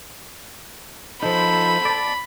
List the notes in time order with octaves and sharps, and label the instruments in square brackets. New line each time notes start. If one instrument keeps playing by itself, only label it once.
[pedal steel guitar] F3 D#4 [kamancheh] A4 C5 [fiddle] B5
[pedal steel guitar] D5 A5